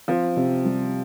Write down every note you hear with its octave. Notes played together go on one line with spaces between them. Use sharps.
F3 C4
C3
G3